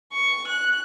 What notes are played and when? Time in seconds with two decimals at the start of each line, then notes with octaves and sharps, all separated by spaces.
0.13 C#6
0.47 F#6